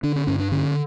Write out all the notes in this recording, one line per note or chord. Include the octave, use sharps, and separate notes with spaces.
D3 D4
C#4
G2 C#4
D4
D3 C#4